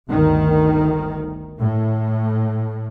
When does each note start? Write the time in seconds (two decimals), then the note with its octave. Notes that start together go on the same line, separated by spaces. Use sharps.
0.11 G1 D2 D#3
1.58 A2